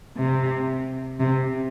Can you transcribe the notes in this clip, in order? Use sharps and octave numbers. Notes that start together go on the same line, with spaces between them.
C3
C3